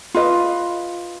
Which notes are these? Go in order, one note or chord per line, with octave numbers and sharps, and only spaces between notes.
F4 B4 D#5